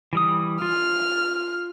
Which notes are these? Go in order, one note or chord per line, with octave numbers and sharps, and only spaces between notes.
E3 G3 D#6
F4 F6